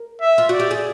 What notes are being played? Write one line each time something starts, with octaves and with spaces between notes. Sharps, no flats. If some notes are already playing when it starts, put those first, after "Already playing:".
Already playing: A#4
E5
F4
F#4 D5
G4
G#4